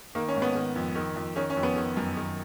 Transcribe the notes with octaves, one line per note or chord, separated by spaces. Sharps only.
D#3 A#3
C#4
G#2
B3
D#3
F2
D#3
F2
D#3 C#4
C#4
F2
B3
D#3
F#2
D#3